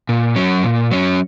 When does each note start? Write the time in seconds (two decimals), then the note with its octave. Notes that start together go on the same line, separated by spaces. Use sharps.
0.09 A#2
0.36 F#3 C#4
0.63 A#2
0.91 F#3 C#4